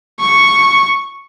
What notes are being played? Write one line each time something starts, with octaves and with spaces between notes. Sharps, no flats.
C#6